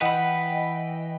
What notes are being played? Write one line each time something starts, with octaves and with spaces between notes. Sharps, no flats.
E3 B4 D#5 F#5 G5 B5